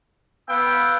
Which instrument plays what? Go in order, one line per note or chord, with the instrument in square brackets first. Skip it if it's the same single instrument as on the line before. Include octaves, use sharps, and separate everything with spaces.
[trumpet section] B3 F5 G5 [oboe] E6